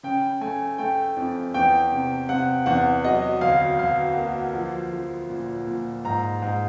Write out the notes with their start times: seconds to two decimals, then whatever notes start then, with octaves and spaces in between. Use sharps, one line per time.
0.03 C#3 G5
0.41 A3 G#5
0.78 A3 G5
1.17 F2
1.54 E2 G5
1.92 C3
2.29 C3 F#5
2.66 E2 F#5
3.05 F#3 D#5
3.41 D2 F5
3.79 D2 F5
4.17 A#3
4.54 F3
4.93 F3
5.30 A#2
5.67 A#2
6.04 G#2 A#5
6.42 G#2